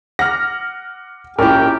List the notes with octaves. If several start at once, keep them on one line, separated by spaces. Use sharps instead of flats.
F#5 D6 F6 A#6
A#1 C#4 E4 G4 A#4 C#5 F6